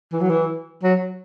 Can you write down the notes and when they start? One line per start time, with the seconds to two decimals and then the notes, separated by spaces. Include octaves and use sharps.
0.12 E3
0.21 F#3
0.29 E3
0.83 F#3